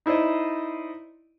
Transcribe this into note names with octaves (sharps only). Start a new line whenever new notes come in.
D#4 E4 C5 D5 D#5